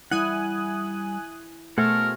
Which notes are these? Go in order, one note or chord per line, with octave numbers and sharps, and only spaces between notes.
G3 E4 F#5 G#5 D#6 F#6
B2 A3 G#4 A#4 C5 F#5